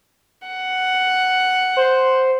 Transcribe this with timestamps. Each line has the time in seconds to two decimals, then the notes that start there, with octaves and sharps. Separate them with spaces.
0.47 F#5
1.77 C5